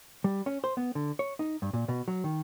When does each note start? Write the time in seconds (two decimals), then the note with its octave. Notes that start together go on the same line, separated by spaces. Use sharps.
0.24 G3
0.46 C#4
0.64 C5
0.77 B3
0.95 D3
1.19 C#5
1.39 D#4
1.62 G2
1.73 A#2
1.88 B2
2.08 F#3
2.24 D#3